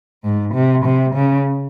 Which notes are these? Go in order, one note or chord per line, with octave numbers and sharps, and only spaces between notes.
G#2
C3
C3
C#3